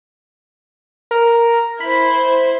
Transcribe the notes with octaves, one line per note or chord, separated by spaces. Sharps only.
A#4
E4 C5 B5